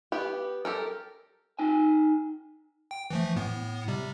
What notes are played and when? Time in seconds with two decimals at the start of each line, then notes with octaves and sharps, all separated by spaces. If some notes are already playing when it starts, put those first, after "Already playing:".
0.12 B3 G4
0.65 G4 A4 A#4
1.59 D#4 G5 G#5
2.91 G5
3.10 E3 F3 A3
3.36 A2 B3
3.88 C3 G3